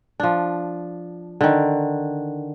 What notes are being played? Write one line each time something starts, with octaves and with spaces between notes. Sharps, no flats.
F3 D4
D3 D#3